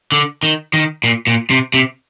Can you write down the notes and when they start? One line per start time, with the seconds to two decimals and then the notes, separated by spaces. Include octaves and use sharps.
0.12 D3
0.43 D#3
0.73 D#3
1.04 A#2
1.27 A#2
1.50 C3
1.74 C3